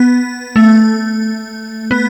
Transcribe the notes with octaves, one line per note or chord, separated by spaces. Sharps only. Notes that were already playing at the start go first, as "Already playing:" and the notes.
Already playing: B3
A3
B3